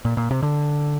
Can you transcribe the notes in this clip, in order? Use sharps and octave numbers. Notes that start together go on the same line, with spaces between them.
A#2
A#2
C3
D3